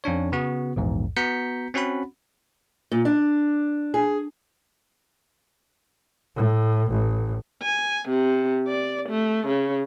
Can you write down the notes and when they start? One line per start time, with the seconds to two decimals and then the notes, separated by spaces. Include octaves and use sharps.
0.04 F2 C#4 D4 C#5
0.32 C#3 B3 F#4
0.76 A#1 E2 G#2
1.17 B3 F#4 A#5 G6 B6 C#7
1.74 C4 C#4 F#4 F#5 B5
2.92 A#2
3.05 D4
3.94 G#4
6.36 A2
6.90 A1
7.62 G#5
8.08 C3
8.67 D5
9.09 A3
9.47 C#3